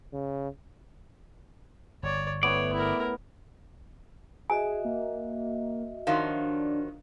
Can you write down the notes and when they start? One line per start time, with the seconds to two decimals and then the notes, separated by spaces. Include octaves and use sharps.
0.13 C#3
2.03 G1 C#5 D5
2.43 A2 B3 C#5 D5 E5
2.73 E4 A#4
4.50 F#4 G#4 D#5 E5 G#5
4.85 A#3
6.07 D#3 F3 F#3 D4 F5